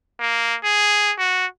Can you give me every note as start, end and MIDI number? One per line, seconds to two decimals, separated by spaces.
0.20 0.56 58
0.64 1.13 68
1.18 1.46 66